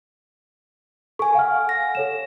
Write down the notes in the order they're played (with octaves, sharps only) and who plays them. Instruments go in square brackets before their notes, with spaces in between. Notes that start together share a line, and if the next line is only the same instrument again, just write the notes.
[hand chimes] A4 G#5 [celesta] C#6
[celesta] F5 F#5 F6
[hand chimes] A#6
[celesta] A4 C#5 E7